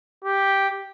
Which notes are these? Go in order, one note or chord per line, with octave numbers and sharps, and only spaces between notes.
G4